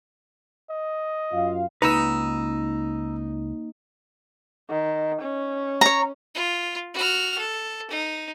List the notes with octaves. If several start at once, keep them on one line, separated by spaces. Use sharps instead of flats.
D#5
F#2 F4 F5
C#2 A#3 D#4 B4 A#5 E6
D#3
C#4
C#5 A#5
F4
F#4 F6
A4
D#4